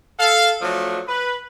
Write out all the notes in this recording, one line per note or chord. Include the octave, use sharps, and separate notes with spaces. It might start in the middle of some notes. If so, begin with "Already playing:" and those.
A4 F5
F3 F#3 A3 D4
B4